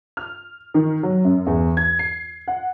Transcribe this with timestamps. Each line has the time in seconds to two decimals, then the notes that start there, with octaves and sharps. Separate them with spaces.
0.17 F6
0.74 D#3
1.03 F#3
1.25 F#2
1.47 E2
1.77 G#6
1.99 C7
2.48 F#5